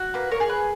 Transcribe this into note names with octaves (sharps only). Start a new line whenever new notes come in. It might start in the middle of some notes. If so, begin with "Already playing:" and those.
Already playing: F#4
A#3 B4
A#4 C#5
G#4
B4